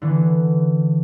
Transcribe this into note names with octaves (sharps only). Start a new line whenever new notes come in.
D3 E3 B3